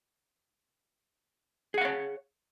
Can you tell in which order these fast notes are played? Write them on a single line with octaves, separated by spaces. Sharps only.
G#4 F#5 F5 C#5